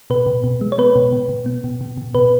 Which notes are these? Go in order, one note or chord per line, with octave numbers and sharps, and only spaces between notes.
B2 B4
B2
B2
G#3
C#5
B3 B4
B2
B2
B2
B3
B2
B2
B2
B2 B4